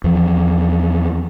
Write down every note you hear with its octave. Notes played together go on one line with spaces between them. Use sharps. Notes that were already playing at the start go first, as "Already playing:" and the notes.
E2 F3